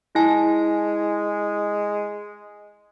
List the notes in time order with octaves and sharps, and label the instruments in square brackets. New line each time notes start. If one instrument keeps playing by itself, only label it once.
[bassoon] G#3 [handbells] E4 G#5 A5